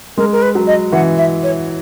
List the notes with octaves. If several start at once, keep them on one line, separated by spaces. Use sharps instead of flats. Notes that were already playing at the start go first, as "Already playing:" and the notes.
G#3 A#4
A#4
B4
F#3
D#5
E3 F#5
E5
C#5